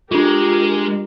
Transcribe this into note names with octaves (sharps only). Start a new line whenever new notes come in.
G#3 D4 F4 G4 A#4